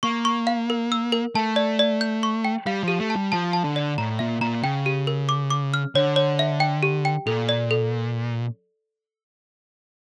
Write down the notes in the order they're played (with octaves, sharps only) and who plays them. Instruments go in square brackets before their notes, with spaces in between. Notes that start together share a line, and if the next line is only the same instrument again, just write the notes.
[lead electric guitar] A#3 [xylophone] C#6
[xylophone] C#6
F5
A#4
E6
A#4
[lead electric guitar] A3 [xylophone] A5
[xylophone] D5
D5
G6
C#6
G5
[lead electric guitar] G3 [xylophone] F5
[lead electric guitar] F3 [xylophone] G4
[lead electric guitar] A3
[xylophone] A5
[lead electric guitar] G3
[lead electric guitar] F3 [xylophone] A5
[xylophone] A5
[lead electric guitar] D3
[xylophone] D5
[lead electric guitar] A2 [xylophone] A#5
[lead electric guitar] A#2 [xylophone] E5
[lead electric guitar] A#2 [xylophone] A#5
[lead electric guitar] C#3 [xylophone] G5
[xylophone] G4
A#4
D6
D6
F6
[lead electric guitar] D3 [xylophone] C#5
[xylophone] C#5
E5
G5
G4
G5
[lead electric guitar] A#2 [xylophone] A4
[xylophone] D5
A4